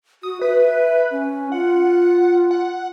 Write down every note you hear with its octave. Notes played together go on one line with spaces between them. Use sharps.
F#4 D#6
B4 E5
C#4
F4 F#5
F#5